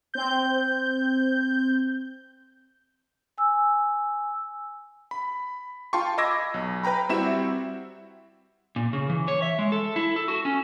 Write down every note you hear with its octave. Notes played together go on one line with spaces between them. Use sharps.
C4 G6
G#5 E6
B5
F4 F5 G5 A5 C6 C#6
D#5 B5 D6 E6 G#6 A#6
B1
B4 G5 A#5 B5
G3 C4 E4 F#4 E5 E7
A#2
C#3
E3
C#5
E5
G#3
A4
E4
A4
F#4
C#4